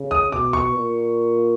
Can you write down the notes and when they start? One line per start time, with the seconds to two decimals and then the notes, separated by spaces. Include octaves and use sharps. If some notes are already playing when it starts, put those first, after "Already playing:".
Already playing: C#3
0.11 D#6
0.32 B2 D6
0.53 C#6
0.74 A#2